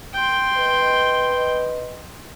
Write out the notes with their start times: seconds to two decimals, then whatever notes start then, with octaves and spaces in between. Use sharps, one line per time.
0.14 G5 C6
0.57 B4 D#5